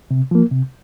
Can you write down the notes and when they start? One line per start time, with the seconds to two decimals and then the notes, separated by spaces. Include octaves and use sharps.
0.11 C3
0.31 F3 A#3
0.51 C3